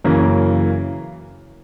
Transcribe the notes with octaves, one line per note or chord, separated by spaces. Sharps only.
F#2 C#3 E3 A#3